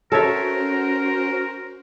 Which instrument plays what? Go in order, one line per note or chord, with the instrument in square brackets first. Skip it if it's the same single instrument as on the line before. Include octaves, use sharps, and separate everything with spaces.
[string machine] C#4 F#4 C5 [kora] A4 C#5 E5 [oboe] A#4